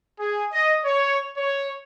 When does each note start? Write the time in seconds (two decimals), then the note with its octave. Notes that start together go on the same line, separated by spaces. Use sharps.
0.19 G#4
0.53 D#5
0.85 C#5
1.36 C#5